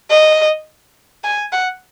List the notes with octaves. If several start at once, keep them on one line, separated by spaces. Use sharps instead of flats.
D#5
G#5
F#5